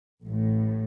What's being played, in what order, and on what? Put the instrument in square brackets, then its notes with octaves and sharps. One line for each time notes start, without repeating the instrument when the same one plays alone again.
[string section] A1 A2